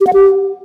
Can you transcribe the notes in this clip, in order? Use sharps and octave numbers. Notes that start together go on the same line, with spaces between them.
G4
F#5
G4